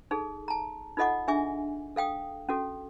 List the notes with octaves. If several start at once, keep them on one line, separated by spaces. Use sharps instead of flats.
D#4 G#4 A4
A5 A#5
D#4 F4 A4 D#5 F#5 D6
D4 G#4 E5 G#5 D6
A4 F5 G5 D#6
C#4 F#4 A4